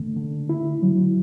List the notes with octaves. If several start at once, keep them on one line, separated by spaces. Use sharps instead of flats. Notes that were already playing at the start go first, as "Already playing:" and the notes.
Already playing: D3 A3
D3
E4
F#3